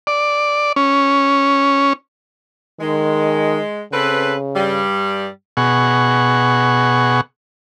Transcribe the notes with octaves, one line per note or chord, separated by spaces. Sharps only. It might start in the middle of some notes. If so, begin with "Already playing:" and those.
D5
C#4
D#3 G#3
C#3 C4 A4 B4
G2 G3
B2 G#4 F#5 C#6